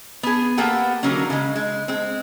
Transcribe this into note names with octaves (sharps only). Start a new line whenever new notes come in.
B3 G#4
A#3 B3 G4 A4 F#5 G5
D3 D#3 F#3 A#3 C#4
C#3 G#3
G#3
G#3 C4